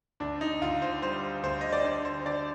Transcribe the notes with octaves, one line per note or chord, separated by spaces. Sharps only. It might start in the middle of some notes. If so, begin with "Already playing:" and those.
D2 D4
D#4
D2 F4
C5
G3 C5
D2 C5
D#5
D5
D3 C5
C5
D3 D5